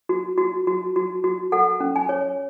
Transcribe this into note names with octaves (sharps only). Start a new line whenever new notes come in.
F#4
F#4
F#4
F#4
F#4
A4 F#5
C#4
G#5
C#5